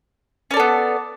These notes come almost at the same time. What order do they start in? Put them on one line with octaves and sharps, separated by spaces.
C#4 D5 A4 B3